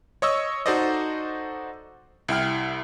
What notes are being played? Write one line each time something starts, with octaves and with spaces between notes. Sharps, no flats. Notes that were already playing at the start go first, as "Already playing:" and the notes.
C#5 D#5 C#6 E6
D#4 F#4 A4 C5 D5 D#5
C2 E4 G5 F6